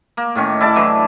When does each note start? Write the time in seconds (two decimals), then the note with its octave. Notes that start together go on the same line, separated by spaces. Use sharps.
0.17 A#3
0.35 A2 D#3 C#4
0.61 E4 D5 A5 D6
0.76 D3 E3 F#3